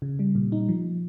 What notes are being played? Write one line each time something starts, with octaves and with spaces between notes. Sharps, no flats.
C#3
G3
A#2
D#4
F3